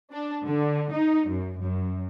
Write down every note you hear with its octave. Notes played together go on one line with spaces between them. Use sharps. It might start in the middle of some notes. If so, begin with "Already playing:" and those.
D4
D3
D#4
F#2
F#2